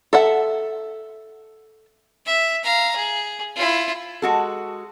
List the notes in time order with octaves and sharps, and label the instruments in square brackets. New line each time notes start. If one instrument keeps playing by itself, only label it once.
[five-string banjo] A4 E5 F#5
[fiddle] E5
F5 A#5
G#4
E4 F4
[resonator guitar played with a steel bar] G#3 F#4 A4